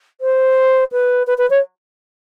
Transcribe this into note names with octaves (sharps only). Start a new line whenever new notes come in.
C5
B4
B4
B4
C#5